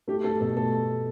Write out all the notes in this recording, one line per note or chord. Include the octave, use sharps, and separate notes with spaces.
A3 G4
A3 A4
B2 A4
A3 A4